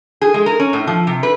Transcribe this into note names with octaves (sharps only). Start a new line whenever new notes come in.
G#4
G#3
A#4
C#4
A2
F3
C3
B4